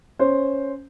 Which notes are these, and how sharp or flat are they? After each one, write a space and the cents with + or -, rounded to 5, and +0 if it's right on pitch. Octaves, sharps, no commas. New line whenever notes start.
C#4 +0 C5 +0